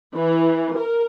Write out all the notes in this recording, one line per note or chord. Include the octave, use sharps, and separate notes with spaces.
E3
A#4